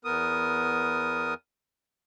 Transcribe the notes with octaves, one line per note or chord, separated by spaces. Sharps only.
E2 B3 A#4 D#6